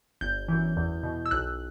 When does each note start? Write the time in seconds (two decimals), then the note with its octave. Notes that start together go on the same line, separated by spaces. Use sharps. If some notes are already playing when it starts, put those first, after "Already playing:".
0.21 G1 G6
0.48 F#2 E3
0.77 E2
1.03 B2
1.26 E6
1.31 B1 F#6